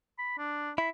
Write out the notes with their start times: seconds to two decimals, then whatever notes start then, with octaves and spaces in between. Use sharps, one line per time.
0.19 B5
0.38 D4
0.78 E4 B5